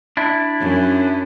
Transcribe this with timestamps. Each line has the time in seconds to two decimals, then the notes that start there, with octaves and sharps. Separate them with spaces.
0.17 D4 E4
0.60 F#2